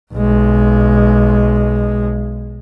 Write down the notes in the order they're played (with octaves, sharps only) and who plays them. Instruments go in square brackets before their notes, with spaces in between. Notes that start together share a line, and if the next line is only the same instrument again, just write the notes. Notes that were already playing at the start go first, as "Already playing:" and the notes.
[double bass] B1 G#3